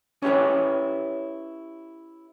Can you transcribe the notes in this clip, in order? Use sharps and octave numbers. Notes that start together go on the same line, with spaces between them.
C#4 E4 G4 B4 C#5